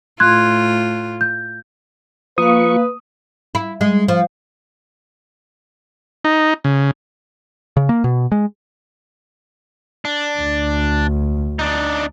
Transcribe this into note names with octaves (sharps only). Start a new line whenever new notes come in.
A2 F4 C6 F#6 G#6
G6
F3 A#3 F4 B4 F5 C#6 D#6
E4
G#3
F3
D#4
C#3
C#3
A#3
B2
G#3
D4
D2
D4 D#4